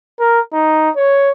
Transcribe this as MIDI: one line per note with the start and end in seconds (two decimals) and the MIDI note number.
0.20 0.40 70
0.53 0.90 63
0.96 1.31 73